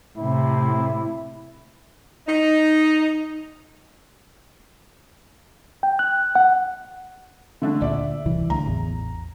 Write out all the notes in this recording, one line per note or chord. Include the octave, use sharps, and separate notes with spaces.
A2 C3 E4
D#4
G5
F#6
F#5
D3 A3 D4
D2 A#2 D5 E5
D1 C2 E3
D2 A#5
A1 E2